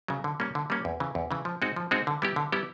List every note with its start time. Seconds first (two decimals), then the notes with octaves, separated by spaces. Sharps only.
0.08 C#3 F#3
0.24 D3
0.40 G3 A#3 C#4
0.55 D3
0.70 G3 A#3 C#4
0.85 E2
1.00 C#3 E3
1.15 E2
1.31 C#3 E3
1.45 F3
1.62 G#3 C4 D#4 F#4
1.76 F3
1.91 G#3 C4 D#4 F#4
2.07 D3
2.22 G3 B3 E4 G4
2.36 D3
2.52 G3 B3 E4 G4